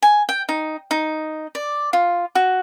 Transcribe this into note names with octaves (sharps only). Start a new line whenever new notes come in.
G#5
G5
D#4
D#4
D5
F4
F#4